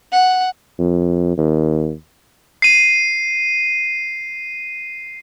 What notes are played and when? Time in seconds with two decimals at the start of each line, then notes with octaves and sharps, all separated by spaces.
0.12 F#5
0.79 F2
1.38 D#2
2.62 C7 D#7